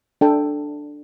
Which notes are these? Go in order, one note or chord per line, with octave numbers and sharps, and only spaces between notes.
D4 A4 G5